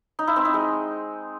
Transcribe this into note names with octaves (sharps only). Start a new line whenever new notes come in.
D#4
E4
C4
D#4
G#3